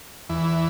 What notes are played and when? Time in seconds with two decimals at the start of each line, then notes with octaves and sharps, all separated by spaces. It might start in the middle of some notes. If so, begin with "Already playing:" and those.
0.29 E2 E3